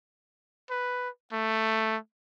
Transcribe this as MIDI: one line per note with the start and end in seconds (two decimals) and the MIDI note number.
0.70 1.09 71
1.33 1.97 57